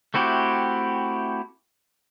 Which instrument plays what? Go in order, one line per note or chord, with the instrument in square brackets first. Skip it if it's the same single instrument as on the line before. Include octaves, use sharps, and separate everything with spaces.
[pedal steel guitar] A3 C4 E4 F#4 G4